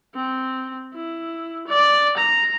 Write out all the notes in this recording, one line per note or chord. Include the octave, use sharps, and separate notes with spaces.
C4
E4
D5
A#5